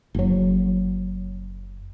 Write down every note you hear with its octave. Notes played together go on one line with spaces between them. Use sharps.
F#1 F#3